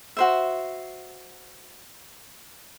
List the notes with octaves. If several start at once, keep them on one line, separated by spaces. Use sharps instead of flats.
F#4 C5 E5